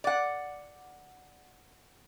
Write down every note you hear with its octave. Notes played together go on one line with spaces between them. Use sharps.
D5 F#5